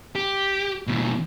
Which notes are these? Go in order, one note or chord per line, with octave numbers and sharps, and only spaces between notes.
G4
D#2 B2